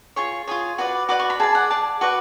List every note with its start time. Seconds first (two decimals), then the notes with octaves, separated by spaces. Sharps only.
0.16 F4 G#4 C#5 C#6
0.47 F4 G#4 C#5
0.78 F#4 B4 D5
1.09 F#4 B4 D5 D6
1.19 C#6
1.30 B5
1.40 G#4 D5 A5
1.55 F#5
1.71 G#4 D5 A5
2.01 F#4 B4 D5 C#6